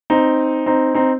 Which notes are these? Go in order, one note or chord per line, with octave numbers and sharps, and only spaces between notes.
C4 D#4
C4 D#4
C4 D#4